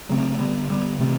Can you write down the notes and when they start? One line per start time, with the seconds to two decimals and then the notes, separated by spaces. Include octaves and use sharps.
0.09 C#3 F#3 A3 C4
0.39 D3 G3 B3
0.69 D3 G3 B3
0.99 C3 E3 A3 C4